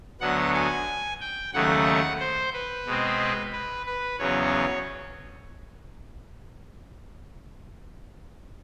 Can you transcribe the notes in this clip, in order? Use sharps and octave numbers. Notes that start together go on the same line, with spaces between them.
D2 D3 F#3 B3 F#5
G#5
G5
D#2 C#3 F#3 A3 F#5
C5
B4
B2 G#3 C4
B4
B4
E2 C#3 F#3 B3 C#5